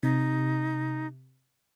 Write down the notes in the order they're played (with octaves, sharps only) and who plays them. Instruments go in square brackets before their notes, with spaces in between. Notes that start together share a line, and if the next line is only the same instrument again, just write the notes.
[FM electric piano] C3 [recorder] D#4